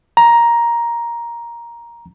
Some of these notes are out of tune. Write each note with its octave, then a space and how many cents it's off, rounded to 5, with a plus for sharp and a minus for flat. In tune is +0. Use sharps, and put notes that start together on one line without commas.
A#5 +10